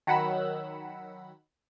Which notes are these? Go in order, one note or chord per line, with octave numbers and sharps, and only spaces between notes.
D#3 F#3 F#5 B5 E6